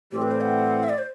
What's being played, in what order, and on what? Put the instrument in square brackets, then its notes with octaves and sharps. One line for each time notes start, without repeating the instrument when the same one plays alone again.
[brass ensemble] A2 E3 G3 C4 E4 [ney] G4
[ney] B4
C5
F#5
E5
D5
C5